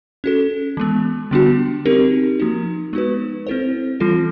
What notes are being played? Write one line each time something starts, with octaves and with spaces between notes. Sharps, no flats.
C#4 F#4 A4
E3 G#3 B3
D3 G3 B3 D4 F#4
C4 D#4 G4 A#4
F3 A#3 D#4 F#4
G#3 B3 D#4 F#4 B4
C4 E4 A4 C5
E3 G3 C4 F4 A4